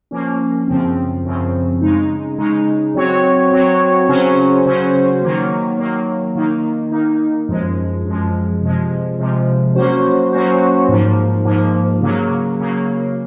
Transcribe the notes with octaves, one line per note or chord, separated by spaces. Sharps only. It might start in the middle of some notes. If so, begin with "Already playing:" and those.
F3 A#3 C#4
F#2 C#3 F3 C4
F#2 C#3 F3 C4
C#3 G#3 D#4
C#3 G#3 D#4
F#3 C4 F#4 C#5
F#3 C4 F#4 C#5
C#3 F#3 C#4 F#4 C5
C#3 F#3 C#4 F#4 C5
D#3 F#3 A#3
D#3 F#3 A#3
D#3 A#3 D#4
D#3 A#3 D#4
F#2 F3 G#3
F#2 F3 G#3
C3 F3 G#3
C3 F3 G#3
F#3 A#3 C#4 F#4 C5
F#3 A#3 C#4 F#4 C5
G#2 F3 A#3
G#2 F3 A#3
C#3 F#3 A#3
C#3 F#3 A#3